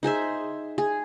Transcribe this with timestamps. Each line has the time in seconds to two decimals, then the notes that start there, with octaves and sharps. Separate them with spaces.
0.03 D#4 G#4 C5 E5
0.78 G#4